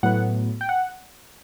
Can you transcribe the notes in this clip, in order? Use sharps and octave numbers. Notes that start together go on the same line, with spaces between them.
A2 F#3 B3 F#5
G5
F#5